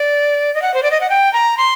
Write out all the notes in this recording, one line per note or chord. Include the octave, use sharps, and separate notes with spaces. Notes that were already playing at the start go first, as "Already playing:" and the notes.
Already playing: D5
D#5
F#5
C5
D5
D#5
F#5
G5
A#5
C6